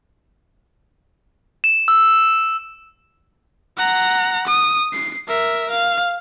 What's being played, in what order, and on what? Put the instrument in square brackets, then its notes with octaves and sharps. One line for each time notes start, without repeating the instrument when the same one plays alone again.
[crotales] E7
E6
[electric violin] F#5 A#5
D#6
C7
A#4 E5
F5